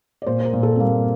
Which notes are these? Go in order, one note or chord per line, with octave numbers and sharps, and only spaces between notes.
D5
A#2 C5
C5
A#4
A#2
A4
C4
G3 A#3